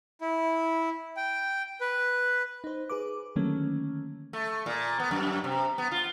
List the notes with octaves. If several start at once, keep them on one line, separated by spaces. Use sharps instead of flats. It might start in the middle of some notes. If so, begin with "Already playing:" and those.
E4
G5
B4
D#4 C5
G#4 B4 D6
D3 D#3 F#3 A3 A#3 C#4
A3
A#2
B3
F#2
C3
B3
F4